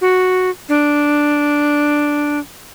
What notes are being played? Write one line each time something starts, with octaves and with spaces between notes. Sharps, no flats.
F#4
D4